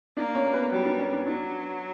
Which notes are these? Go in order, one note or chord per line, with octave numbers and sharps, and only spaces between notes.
A#3 D4 D5
C#4 C#5
A#4
B3 B4
F#3 G3 F#4
D4
C#4
D4
F#3 D4